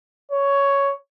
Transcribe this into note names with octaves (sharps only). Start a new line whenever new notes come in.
C#5